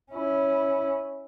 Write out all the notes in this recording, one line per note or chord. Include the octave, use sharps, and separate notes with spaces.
C#4 E4